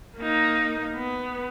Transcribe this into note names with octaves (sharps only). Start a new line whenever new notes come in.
A#3 D#4
B3